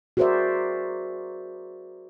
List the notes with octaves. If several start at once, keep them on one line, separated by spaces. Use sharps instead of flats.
F#4 G#4 A#4 C5 D5 E5